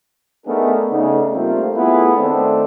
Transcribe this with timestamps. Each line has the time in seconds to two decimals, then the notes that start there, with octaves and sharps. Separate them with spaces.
0.46 A3 B3 D4 D#4 G#4 A#4
0.91 C#3 A3 B3 D4 D#4
1.34 G3 A3 A#3 C4 F4
1.76 A3 B3 E4 F4 G#4 B4
2.17 D#3 A3 C4 D4 A4